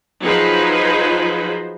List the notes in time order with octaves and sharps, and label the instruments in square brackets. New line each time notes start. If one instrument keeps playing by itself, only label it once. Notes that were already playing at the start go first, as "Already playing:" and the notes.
[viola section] F3 F#3 D#4 G#4 B4 C5